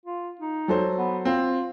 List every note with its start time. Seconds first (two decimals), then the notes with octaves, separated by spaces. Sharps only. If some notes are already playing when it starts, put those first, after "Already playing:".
0.05 F4
0.41 D#4
0.68 F#3 A4 C5
0.98 B3
1.25 C4 F4